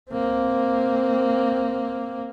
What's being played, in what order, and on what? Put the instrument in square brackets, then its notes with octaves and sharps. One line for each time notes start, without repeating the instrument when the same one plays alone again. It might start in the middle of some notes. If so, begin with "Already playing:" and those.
[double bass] A#3 C4